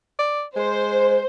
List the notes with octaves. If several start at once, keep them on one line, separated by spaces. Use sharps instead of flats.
D5
G#3 C5